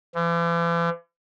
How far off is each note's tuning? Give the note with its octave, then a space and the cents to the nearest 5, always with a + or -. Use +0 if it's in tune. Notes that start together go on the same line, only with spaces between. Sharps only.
E3 +45